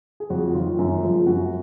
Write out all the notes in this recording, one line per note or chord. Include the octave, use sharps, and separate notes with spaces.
G#4
F2 F#4
D#3 F#3 F4
F#2
F3 G#3
F#2 F#4